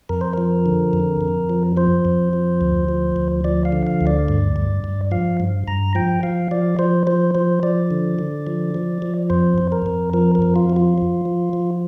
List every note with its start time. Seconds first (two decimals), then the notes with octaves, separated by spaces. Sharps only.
0.09 F2 A#4
0.21 C5
0.33 F3 A#4
0.66 D3
0.93 F2
1.21 F2
1.49 F3
1.77 F3 C5
2.05 F2
2.33 F3
2.61 D2
2.89 F3
3.16 D2
3.44 F3 D5
3.65 F5
3.72 D3
3.87 F5
4.01 D2
4.07 D5
4.28 G2
4.56 G2
4.84 G2
5.11 F3 F5
5.40 G2
5.68 G2 A#5
5.95 F3 G5
6.23 F3 F5
6.51 F3 D5
6.79 F3 C5
7.07 F3 C5
7.35 F3 C5
7.63 F3 D5
7.91 D3
8.19 D3
8.47 F3
8.74 F3
9.02 F3
9.30 F2 C5
9.58 F2
9.72 A#4
9.86 F2
10.13 F3 A#4
10.35 A#4
10.42 F2
10.56 F4
10.70 F3
10.76 F4
10.98 F3
11.25 F3
11.53 F3